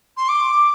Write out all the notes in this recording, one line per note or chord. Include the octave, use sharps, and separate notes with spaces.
C6
D6